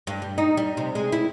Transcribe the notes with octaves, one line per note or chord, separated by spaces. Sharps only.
G2
G3
D#4
G3
C3
G#3
E4